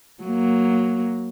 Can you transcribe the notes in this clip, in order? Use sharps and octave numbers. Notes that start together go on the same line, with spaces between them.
F#3 A#3